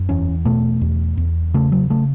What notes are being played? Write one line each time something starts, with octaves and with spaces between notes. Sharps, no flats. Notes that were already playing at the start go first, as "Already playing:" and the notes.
Already playing: F#2
E2 C#4
B2 A3
E2
E2
C#3 A3
F#3
C#3 A3